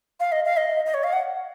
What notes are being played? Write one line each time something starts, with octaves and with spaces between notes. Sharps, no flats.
F5
D#5
F5
D#5
D#5
C#5
F5
F#5